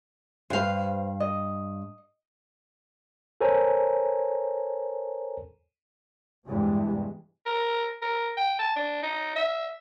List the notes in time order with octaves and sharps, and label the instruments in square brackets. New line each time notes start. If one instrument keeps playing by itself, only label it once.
[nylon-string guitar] G2 F5 [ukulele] B4 C5
[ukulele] D#5
[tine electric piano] A4 A#4 C5 C#5 G#5 A#5
[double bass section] E2 G2 C3 E3 G#3
[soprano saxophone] A#4
A#4
G5
A5
D4
D#4
E5